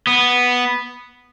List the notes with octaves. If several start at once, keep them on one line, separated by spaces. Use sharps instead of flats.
B3